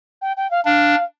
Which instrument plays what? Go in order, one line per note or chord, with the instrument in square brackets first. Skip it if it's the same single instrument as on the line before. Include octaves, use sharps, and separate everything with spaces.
[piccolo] G5
G5
F5
[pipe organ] D4 [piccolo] F5